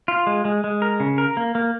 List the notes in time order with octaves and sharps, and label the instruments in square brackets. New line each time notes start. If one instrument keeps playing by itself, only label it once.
[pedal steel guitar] F4
G#3
G#3
G#3
A#4
C#3
A#4
A#3
A#3